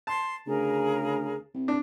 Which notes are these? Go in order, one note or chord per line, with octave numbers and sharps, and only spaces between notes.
A5 C6
D2 C#3 G#4 A#4 A#5
C2
D4